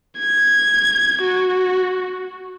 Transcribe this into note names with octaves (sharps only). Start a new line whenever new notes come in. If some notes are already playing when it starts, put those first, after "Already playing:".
G#6
F#4